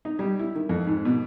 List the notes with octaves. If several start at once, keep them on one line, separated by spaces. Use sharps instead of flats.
D#4
G3
E4
D#3
F2
G#2
B2